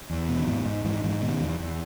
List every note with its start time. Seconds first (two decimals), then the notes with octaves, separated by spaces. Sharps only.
0.10 E2
0.29 B2
0.38 D#3
0.47 G#2 E3
0.65 G#2
0.85 G#2 E3
1.04 G#2 E3
1.22 B2 D#3
1.40 E2
1.59 E2